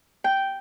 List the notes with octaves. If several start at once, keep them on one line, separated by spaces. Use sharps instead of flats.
G5